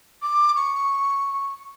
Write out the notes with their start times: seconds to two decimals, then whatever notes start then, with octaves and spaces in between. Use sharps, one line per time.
0.22 D6
0.56 C#6